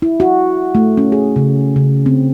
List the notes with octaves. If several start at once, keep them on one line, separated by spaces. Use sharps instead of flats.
E4
F#4
A3
C#4
G#4
C#3
C#3
C4